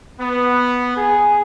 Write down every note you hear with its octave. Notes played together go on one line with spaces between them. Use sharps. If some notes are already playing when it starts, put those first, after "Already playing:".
B3
G#4